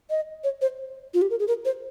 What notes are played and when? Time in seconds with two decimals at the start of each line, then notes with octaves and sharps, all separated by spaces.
0.10 D#5
0.44 C#5
0.61 C5
1.14 F4
1.22 G4
1.30 A#4
1.40 G#4
1.48 A#4
1.65 C5